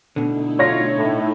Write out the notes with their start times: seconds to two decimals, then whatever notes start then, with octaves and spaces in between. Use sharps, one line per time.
0.16 B2 D3 A3 D#4 E4
0.59 F#3 D4 F4 C#5 A#6
0.97 A2